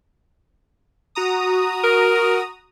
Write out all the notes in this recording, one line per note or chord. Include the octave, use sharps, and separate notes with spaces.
F#4 A#5 D#6
A#4